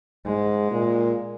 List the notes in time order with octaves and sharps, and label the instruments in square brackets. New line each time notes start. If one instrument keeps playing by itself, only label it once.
[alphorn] G#2 [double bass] G#3
[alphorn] A#2